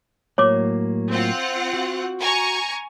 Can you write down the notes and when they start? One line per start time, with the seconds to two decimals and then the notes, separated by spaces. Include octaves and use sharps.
0.38 A2 F#3 A#3 C#5 D6
1.10 C4 F4 F#5
1.73 F#4
2.20 G#5 A#5 C#6